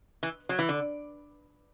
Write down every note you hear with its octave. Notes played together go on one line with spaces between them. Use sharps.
E3
F#3
E3
D3